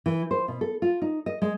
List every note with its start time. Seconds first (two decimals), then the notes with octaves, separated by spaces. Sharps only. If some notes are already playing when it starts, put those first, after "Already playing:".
0.06 E3
0.31 C5
0.48 B2
0.61 A4
0.82 F4
1.02 D#4
1.26 D#5
1.42 G#3